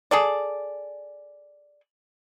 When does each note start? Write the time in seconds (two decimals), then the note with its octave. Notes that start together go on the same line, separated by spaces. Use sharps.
0.11 G#4 A4 D5